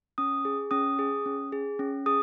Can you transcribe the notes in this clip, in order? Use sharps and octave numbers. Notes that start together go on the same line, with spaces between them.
C#4 D#6
G#4
C#4 D#6
G#4
C#4
G#4
C#4
G#4 D#6